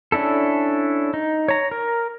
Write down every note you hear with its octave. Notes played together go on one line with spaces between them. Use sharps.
C#4 D4 E4 A4
D#4
C#5 A#5
A#4